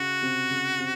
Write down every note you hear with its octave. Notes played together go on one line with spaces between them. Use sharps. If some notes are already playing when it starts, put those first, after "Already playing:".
Already playing: C#3 F#4
C3
C#3
C3